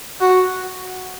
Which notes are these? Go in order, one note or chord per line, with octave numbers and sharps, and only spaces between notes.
F#4